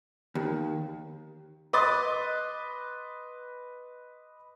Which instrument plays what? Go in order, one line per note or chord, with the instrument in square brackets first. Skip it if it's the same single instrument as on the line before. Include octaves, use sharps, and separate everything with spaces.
[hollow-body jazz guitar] D#2
[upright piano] B4 D#5 C6 D6 D#6 A6